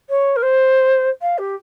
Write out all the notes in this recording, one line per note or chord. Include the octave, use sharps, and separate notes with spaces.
C#5
A#4
C5
F5
G4